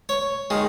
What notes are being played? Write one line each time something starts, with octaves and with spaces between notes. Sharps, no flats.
C#5
D#3 G#3